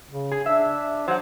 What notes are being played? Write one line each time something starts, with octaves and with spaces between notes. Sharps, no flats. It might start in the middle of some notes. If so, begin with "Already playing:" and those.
C#3
G#4
D4 E5
F#3 C5 F#5